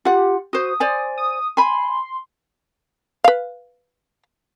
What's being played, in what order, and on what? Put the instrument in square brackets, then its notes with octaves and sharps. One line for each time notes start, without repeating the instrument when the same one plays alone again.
[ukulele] F4 F#5 [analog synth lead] G4
[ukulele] F#4 C5 [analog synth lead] D#6
[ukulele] C5 D5 G#5
[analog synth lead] D#6
[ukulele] G#5 B5 [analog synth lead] C6
[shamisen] B4 F5